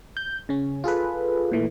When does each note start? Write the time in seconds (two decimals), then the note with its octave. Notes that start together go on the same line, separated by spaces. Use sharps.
0.17 G6
0.49 C#3 C#4
0.84 F4 G#4 A4 B4
1.52 A#2 E3 A3